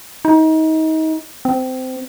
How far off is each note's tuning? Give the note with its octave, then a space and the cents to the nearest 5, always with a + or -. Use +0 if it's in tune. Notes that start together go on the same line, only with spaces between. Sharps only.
D#4 +30
C4 -20